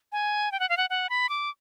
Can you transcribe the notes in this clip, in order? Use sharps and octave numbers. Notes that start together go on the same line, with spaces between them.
G#5
G5
F#5
F5
F#5
F#5
B5
D6